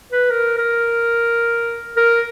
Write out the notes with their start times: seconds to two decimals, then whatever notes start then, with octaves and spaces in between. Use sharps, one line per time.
0.12 B4
0.31 A#4
0.58 A#4
1.96 A#4